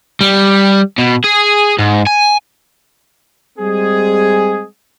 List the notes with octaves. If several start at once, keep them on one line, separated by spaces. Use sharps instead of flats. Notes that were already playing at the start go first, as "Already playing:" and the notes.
G3
B2
G#4
G#2
G#5
G3 G#3 C4 G#4